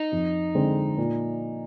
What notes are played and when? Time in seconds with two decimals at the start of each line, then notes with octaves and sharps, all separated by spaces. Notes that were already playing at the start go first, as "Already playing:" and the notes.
Already playing: D#4
0.12 F2
0.55 D3 G#3 C4
0.98 A#2